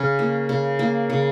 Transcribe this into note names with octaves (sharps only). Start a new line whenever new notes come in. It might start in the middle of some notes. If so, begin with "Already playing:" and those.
Already playing: C#3 C#4
A#3
C#3
A#3
C#3